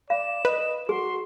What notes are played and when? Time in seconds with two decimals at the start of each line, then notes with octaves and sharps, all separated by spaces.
0.10 D5 F5 E7
0.45 B4 D#5
0.89 F#4 G#4 C6